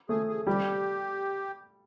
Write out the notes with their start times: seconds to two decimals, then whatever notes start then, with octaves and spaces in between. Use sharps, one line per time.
0.09 A3 G#4
0.28 G#4
0.47 G3 G4